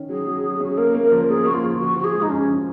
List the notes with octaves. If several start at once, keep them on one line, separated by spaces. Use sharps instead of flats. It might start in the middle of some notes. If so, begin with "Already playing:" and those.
Already playing: D#3 C#4
F#3 G#4
F#3
F#3
C#4 F#4
G#4
A#3 A#4
A#3
A#4
F3
A#3 G#4
A#3 F#4
F4
F3
F3 F#4
F3 F#4
G#4
G#3
D#4
F#2 C#4
F3